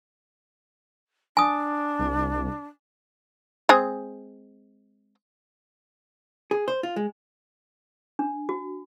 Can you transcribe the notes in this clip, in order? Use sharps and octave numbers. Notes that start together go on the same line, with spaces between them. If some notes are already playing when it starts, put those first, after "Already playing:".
D4 G#5 D#6
C2
G#3 C4 G#4
G#4
C5
F4
G#3
D4
F#4